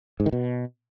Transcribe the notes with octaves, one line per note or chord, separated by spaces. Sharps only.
G#2
D#3
B2